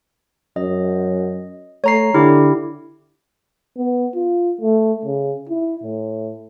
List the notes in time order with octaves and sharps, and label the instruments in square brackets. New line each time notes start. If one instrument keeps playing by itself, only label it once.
[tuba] F#2 [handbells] D#5
[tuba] A3 [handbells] C#5 A#5 C7
[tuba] D3 [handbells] E4 G4
[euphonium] B3
F4
A3
C#3
E4
A2